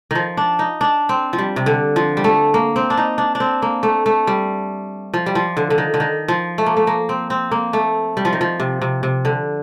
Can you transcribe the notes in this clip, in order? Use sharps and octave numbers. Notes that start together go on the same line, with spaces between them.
D#3 F3
D4
D#4
D4
C4
F3
G3
C3
D3
F3
G3
A3
A#3
C4
D4
D#4
D4
D4
C4
A#3
A3
A3
G3
F3
G3
F3
D3
D3
D#3
D3
D#3
F3
A3
A#3
A3
A#3
C4
C4
A#3
A3
G3
F3
D#3
F3
C3
C3
C3
D3